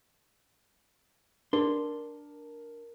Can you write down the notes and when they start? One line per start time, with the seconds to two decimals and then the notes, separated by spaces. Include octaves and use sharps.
1.53 D4 A#4 C6